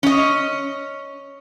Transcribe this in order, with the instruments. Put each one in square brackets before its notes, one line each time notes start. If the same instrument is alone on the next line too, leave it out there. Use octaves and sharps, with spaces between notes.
[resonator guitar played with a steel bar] C#4 D#5